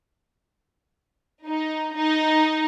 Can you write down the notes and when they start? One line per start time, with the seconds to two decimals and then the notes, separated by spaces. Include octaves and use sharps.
1.47 D#4
1.97 D#4